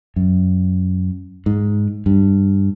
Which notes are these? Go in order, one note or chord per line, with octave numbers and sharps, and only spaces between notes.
F#2
G#2
G2